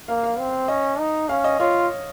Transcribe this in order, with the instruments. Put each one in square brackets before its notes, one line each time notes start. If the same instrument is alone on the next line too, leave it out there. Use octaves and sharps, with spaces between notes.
[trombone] A#3 [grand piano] F5
[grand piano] F5
[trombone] C4
[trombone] C#4 [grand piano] D#5
[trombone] D#4
[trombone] C#4 [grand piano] F5
[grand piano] D#5
[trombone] F4 [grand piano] C#5